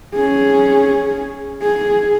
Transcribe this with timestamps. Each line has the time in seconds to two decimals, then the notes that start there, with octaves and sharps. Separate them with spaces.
0.15 C#4 G#4
1.63 G#4